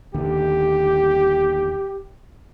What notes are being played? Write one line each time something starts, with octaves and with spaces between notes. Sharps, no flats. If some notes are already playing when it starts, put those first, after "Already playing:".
D#1 D#2 D3 G4